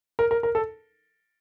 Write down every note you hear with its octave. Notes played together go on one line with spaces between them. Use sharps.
A#4
A#4
A#4
A4